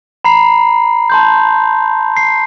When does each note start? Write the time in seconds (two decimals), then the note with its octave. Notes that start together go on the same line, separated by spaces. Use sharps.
0.24 A#5 B5 C7
1.10 A5 C6 G6
2.17 C7